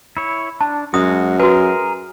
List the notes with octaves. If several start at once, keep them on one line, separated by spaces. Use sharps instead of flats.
E4 C#5
D4 A5
F#2 G#3 F#4 D#6
F#4 G#4 A#4 B4